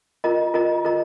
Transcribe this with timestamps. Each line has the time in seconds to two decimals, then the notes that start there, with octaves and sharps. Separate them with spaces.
0.24 F4 A#4 D#5 A#5
0.54 F4 A#4 D#5 A#5
0.85 F4 A#4 D#5 A#5